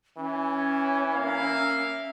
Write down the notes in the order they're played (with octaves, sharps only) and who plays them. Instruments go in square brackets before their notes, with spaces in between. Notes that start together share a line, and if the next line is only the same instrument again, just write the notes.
[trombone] E3 [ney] C#4
[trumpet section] A#3 E5 F5